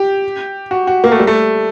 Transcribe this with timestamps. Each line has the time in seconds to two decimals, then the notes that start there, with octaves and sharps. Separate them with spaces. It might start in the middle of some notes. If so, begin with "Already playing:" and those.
Already playing: G4
0.71 F#4
0.87 F#4
1.04 A#3
1.12 A3
1.19 G3
1.27 A3